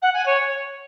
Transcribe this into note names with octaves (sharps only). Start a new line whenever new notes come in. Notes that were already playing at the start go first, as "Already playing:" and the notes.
F#5
G#5
C#5